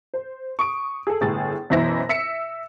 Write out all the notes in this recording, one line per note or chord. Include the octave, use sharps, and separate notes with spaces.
C5
C#6 D#6 D7
G#4 A4
G1 A2 G#4 A6
F#2 B2 E3 E4 C5 A#6
E5 E6 B6 C#7